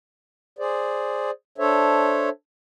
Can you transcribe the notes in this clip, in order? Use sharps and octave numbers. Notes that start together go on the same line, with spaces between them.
G#4 C5 D5
D4 A4 C5 C#5 E5